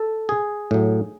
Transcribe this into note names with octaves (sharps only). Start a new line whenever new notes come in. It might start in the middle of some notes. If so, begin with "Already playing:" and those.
Already playing: A4
G#4
A2 F#3